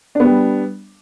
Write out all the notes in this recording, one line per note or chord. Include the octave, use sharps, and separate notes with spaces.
G3 B3 D4